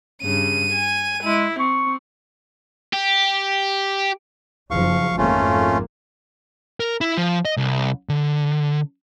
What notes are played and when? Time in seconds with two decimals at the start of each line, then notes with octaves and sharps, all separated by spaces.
0.22 G2 C#3 D#7
0.72 G#5
1.23 G#3 E4
1.59 C4 C#6
2.93 G4
4.71 F#1 F3 F5 C#6
5.18 G#1 F2 A3 A#3 C#4 F4
6.80 A#4
7.01 E4
7.17 F3
7.45 D#5
7.57 C2
8.09 D3